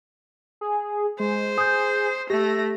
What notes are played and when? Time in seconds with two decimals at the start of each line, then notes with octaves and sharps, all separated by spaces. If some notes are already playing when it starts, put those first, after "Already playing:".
0.61 G#4
1.20 G#3 C5
1.58 G#4 D#6 G6
2.30 A3 G4 A#6